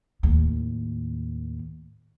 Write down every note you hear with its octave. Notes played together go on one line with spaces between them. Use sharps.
D#2 A2